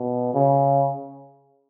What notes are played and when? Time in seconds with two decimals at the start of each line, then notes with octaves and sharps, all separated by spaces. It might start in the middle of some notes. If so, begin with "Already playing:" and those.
Already playing: B2
0.34 C#3